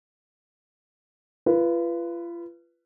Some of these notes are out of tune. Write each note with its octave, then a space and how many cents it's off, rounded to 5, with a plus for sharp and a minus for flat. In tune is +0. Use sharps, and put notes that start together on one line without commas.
F4 -35 B4 +0